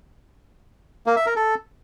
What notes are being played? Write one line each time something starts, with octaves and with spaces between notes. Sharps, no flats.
A#3
E5
A#4
A4